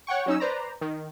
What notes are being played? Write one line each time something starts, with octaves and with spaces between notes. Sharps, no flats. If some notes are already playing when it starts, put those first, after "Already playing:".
C#5 F#5 G5 C#6
F#3 C#4 D#4 E6
B4 C5 D5 A#5
D#3